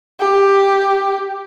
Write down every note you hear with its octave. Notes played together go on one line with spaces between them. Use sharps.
G4